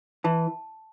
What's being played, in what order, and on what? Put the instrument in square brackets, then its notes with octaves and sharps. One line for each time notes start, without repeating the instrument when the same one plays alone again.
[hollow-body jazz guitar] E3 [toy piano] A5